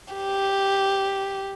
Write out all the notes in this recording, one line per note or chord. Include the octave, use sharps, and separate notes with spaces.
G4